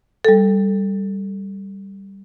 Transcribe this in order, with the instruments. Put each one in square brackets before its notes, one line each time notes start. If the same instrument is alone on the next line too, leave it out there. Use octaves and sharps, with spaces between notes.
[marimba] G3 A4